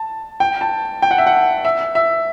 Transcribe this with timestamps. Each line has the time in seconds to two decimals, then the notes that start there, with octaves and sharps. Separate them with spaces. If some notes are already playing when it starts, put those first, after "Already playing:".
Already playing: A5
0.40 G5
0.61 A5
1.02 G5
1.11 F#5
1.18 E5
1.26 F#5
1.65 E5
1.95 E5